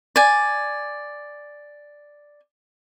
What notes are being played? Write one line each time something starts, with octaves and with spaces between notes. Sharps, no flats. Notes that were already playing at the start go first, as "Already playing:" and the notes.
D5 G#5